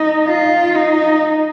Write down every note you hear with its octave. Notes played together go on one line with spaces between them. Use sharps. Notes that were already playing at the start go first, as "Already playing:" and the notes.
Already playing: D#4
F4
D#4